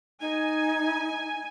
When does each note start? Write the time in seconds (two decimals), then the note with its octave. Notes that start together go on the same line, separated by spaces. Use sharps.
0.21 D#4 G#5